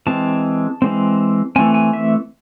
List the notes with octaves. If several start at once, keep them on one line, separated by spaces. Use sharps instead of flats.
E3 G#3 C4 A5
E3 G#3 C4
E3 A3 C4 G#5
G#5
E5